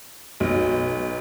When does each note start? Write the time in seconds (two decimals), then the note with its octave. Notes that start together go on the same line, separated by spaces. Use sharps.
0.40 B1